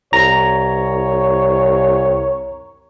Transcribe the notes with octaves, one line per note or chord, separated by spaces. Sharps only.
C2 C#5 A#5